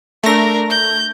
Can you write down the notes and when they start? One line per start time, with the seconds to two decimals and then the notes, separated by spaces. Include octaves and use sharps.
0.24 A3 D4 A#4 A#6
0.70 G6